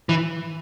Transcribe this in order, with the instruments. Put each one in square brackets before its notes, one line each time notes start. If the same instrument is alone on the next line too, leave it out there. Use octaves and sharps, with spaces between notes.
[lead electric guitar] E3